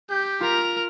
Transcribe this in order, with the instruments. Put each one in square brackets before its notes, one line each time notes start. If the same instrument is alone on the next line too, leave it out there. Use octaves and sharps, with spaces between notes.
[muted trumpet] G4 [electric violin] G6
[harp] F4 B6 [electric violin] A#4 A#5